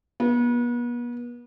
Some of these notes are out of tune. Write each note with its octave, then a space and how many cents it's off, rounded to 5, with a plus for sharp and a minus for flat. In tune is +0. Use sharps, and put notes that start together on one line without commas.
B3 -40